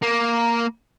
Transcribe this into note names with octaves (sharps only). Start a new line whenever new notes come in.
A#3